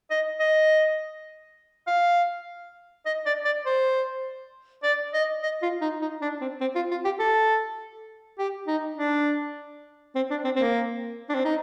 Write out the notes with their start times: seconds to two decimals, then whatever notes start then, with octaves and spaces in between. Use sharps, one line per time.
0.11 D#5
0.40 D#5
1.87 F5
3.06 D#5
3.26 D5
3.45 D5
3.66 C5
4.83 D5
5.14 D#5
5.43 D#5
5.62 F4
5.81 D#4
6.01 D#4
6.22 D4
6.41 C4
6.61 C4
6.75 F4
6.91 F4
7.05 G4
7.19 A4
8.39 G4
8.67 D#4
8.98 D4
10.16 C4
10.31 D4
10.45 C4
10.56 C4
10.59 A#3
11.29 D4
11.34 C4
11.45 D#4